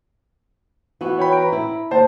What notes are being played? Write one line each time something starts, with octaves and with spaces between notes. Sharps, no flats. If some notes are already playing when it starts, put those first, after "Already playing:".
E3 B3 F#4
C#5 G5 B5
A#5 D7
E4
D#2 C5 A5